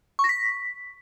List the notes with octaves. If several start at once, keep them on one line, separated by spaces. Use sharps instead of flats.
C#6
A#6
B6